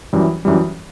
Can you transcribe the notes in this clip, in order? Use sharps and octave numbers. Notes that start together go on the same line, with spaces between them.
F#2 E3 G3
F#2 E3 G3